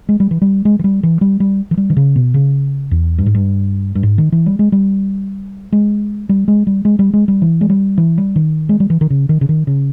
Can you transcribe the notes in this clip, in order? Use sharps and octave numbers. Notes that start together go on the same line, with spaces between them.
G#3
G3
E3
G3
G#3
E3
G3
E3
G3
G3
E3
G3
D#3
C#3
B2
C#3
E2
G2
G#2
G2
G2
G#2
D#3
E3
G3
G#3
G3
G#3
G3
G#3
G3
G#3
G3
G#3
G3
E3
G#3
G3
E3
G3
D#3
G#3
G3
E3
D#3
C#3
D#3
C#3
D#3
C#3